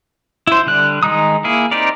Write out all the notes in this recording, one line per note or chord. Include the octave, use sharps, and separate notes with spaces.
E4 C5
D3 G3 F#6
D#3 G#3 D#4 A#5 D#6
A#3 E4 G#4
C4 D#4 G4 A#4 D5